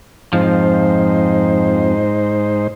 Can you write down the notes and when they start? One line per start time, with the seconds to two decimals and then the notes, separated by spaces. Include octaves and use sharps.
0.33 F2 G#2 F3 D#4 C5